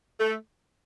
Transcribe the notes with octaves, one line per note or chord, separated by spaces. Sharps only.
A3